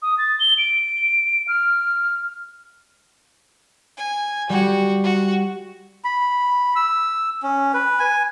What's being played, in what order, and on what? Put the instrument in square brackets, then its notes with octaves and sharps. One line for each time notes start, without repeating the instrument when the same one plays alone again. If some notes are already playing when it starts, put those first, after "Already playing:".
[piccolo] D#6
A6
G7
D7
F6
[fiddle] G#5
[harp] G3 G4 [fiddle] F#4
[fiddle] F#4
[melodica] B5
E6
C#4
B4
G#5